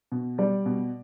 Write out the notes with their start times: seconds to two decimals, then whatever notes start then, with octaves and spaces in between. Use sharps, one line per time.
0.12 B2
0.38 G3 D5
0.66 B2